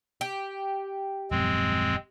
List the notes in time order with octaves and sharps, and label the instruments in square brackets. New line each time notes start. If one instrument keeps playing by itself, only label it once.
[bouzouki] G4
[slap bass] D#1 F#2 F3 [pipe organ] G#3 C4